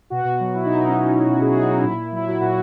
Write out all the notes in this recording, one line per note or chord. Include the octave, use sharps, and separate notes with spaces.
B2 F#4
B2
F#3
F#3 E4
D#4
B2
D#4
B2 C#4
F#3 D#4
F#3
F#4
B2
B2 G#4
F#3 F#4
D#4
F#3 E4
A#2
A#2
F#3 E4
F#3 F#4
A#2 F#4